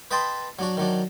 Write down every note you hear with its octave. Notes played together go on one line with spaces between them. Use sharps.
B4 D#5 G5 A5 B5 C6
F#3 D4 F#4
D#3 F#3 D4